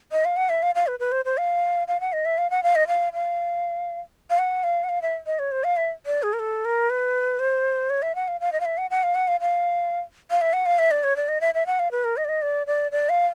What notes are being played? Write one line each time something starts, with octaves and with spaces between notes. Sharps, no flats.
D#5
F5
F#5
E5
F5
F5
B4
B4
C5
C5
F5
F5
F#5
D#5
E5
F5
F#5
F5
D#5
F5
F5
F5
F#5
F5
F#5
F5
E5
D#5
C#5
C5
F5
E5
D5
G#4
A#4
A4
A#4
B4
C5
C#5
E5
F#5
F5
F5
D#5
F5
E5
F#5
F#5
F5
F#5
F5
F5
F5
E5
F#5
F5
E5
D5
C#5
D5
D#5
E5
E5
F#5
F5
B4
A#4
D#5
D5
D#5
D5
D5
D5
F5